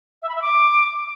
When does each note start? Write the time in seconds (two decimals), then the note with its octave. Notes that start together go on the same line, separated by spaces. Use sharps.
0.22 E5
0.29 B5
0.35 E5
0.42 D6